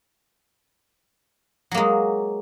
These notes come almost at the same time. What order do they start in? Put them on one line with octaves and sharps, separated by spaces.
F#3 A#3 G#3